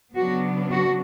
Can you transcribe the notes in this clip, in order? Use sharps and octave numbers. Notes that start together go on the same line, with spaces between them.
C#3 F#3 B3 D4 F#4
F#4